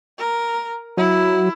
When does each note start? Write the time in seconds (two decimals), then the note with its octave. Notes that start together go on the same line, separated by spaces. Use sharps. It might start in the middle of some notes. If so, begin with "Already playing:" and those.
0.18 A#4
0.97 F#3 E4